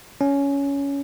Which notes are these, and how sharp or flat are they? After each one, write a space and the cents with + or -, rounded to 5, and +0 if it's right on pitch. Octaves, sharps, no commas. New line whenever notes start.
C#4 +15